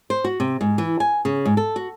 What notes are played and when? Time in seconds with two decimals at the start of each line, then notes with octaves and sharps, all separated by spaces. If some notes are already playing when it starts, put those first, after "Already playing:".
0.10 C5
0.24 F#4
0.40 C3
0.61 G#2
0.78 E3
1.00 G#5
1.25 C#3
1.45 G#2
1.57 A4
1.76 F#4